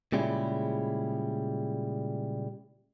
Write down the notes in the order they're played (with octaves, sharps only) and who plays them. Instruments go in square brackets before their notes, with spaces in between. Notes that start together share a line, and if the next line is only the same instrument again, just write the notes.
[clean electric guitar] A#2 C#3 G3 G#3 E4